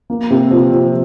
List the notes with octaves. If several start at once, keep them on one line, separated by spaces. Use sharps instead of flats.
A#3
C3
F3
F3